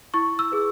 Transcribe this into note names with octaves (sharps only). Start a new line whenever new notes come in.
E4 C#6
E6
G#4 B4